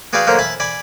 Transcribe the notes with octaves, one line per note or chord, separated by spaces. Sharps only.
F#4 G#4 B4 D5 F5 G5
D3 F#3 A#3 A#4 C5 A#5
E5 G#5 A5 B5
D5 G#5 B5